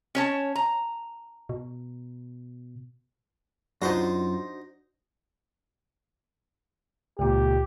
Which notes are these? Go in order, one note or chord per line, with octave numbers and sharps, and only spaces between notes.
C#4 C#5 A5
A#5
B2
F#2 D4 D#4 F4 F#4 C5 A#5 C6
C#2 A#2 G4